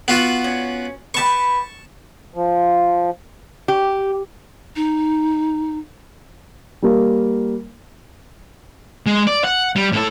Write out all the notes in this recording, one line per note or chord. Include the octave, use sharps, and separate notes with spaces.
B3 F4 F#4
C#4
G4 B4 A5 C#6
F3
G4
D#4
G3 A#3
G#3
D5
F#5
G3
A2 A4